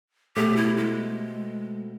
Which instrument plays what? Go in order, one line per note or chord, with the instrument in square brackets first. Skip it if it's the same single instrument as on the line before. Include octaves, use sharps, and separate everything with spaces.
[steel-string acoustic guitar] B2 A3 C4 [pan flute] G4
[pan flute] E4
G#3